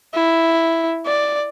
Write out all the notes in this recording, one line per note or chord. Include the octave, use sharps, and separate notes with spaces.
E4
D5